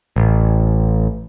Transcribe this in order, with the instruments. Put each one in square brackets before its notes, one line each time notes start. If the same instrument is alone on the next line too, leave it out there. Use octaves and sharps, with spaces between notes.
[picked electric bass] A1